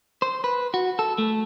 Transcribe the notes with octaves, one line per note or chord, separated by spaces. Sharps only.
C5
B4
F#4
A4
A3